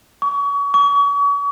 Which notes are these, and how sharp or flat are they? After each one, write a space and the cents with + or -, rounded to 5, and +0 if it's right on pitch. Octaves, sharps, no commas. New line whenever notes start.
C#6 +35
C#6 +40